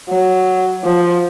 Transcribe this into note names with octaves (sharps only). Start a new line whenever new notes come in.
F#3
F3